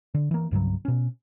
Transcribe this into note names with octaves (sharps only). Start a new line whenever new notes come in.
D3
E3 A#3
C2 G2 C#3 F#3
B2 C#4